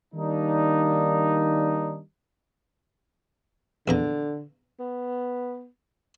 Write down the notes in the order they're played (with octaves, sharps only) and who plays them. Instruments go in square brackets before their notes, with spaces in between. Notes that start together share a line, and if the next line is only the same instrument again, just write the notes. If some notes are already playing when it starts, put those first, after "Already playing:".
[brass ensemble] D#3 G3 A#3 D4 D#4
[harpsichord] A#1 E2 A#5 [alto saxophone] D3
[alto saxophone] B3